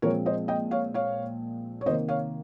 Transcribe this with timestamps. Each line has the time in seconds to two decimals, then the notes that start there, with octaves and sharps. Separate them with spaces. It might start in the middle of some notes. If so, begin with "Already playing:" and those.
0.02 A#2 F3 G#3 C4 A#4 C#5
0.26 C5 D#5
0.48 D#5 G5
0.71 C#5 F5
0.94 C#5 F5
1.81 C#5
1.86 C3 D#3 A#3 C5 D#5
2.08 C#5 F5